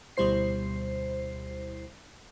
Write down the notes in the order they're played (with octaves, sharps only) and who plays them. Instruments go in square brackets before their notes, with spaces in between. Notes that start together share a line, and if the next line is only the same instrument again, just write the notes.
[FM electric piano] D2 B2 G3 E4 C5 C7